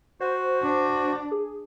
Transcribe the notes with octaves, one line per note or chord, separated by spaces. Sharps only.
F#4 C5
D4
G#4